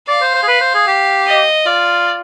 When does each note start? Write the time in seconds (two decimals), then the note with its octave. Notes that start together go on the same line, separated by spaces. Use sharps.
0.08 D5 F5
0.22 C5
0.35 C5
0.43 G#4
0.48 B4
0.61 C5
0.74 G#4
0.87 G4
1.26 D#5
1.66 F4 D5